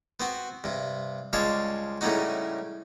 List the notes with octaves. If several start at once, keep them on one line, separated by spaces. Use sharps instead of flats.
B3 C4 F#4
G2 C3
C#2 G3 G#3 C#5 F5 A5
A2 C#3 G3 C#4 D#4 F#4